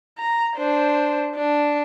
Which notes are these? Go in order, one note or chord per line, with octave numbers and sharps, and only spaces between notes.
A#5
D4 C5
D4